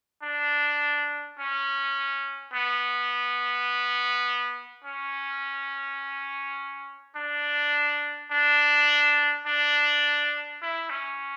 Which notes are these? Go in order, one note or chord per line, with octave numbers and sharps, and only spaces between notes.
D4
C#4
B3
C#4
D4
D4
D4
E4
C#4